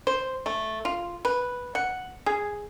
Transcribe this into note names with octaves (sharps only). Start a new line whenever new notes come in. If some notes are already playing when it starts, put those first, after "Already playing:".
C5
A3
F4
B4
F#5
G#4